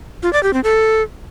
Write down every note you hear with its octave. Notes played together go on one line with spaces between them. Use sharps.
F4
D5
G4
C4
A4